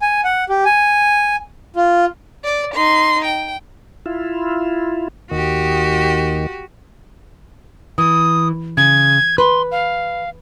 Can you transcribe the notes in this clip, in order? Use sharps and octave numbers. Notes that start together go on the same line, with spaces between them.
G#5
F#5
G4
G#5
F4
D5
D#4 C6
G5
E4 F4
D#2 D#3 F#4 G4
E3 D#6
C#3 G#6
B4 C6
F5